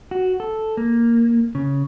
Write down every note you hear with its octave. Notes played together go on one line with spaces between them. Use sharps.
F#4
A4
A#3
C#3